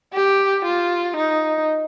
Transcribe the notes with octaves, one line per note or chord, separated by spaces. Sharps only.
G4
F4
D#4